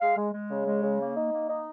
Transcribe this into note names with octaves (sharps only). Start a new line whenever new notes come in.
G#3 F5
G#3
G#3
C#3
G#3
C#3
A#3
D#4
A#3
D#4